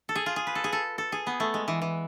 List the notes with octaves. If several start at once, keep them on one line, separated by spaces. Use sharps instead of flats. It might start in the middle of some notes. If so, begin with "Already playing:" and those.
A4
G#4
F4
G#4
B4
A4
G#4
A4
A4
G#4
B3
A3
G#3
E3
E3